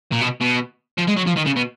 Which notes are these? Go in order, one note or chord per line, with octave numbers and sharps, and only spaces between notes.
A#2
B2
B2
F3
G#3
F#3
F3
D#3
C#3
B2